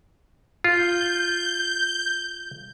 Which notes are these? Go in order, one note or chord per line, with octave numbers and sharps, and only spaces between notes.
F4 G6